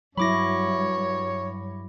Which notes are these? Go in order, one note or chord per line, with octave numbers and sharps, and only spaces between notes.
G2 F#3 E4 C#5 B5 D6 A#6